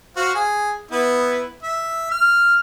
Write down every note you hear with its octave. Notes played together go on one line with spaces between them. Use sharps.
F#4 C5 F5
G#4
B3 E4 B4
E5
F6